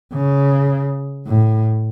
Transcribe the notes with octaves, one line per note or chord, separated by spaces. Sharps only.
C#3
A2